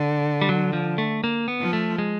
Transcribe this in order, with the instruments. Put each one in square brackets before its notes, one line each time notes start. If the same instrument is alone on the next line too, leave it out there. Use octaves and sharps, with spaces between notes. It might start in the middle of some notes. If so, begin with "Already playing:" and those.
Already playing: [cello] D3
[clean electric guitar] G3
F#3
F3
A3
A#3
B3
[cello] F3
[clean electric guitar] A3
G#3